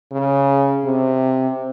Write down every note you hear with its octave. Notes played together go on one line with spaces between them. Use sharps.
C#3
C3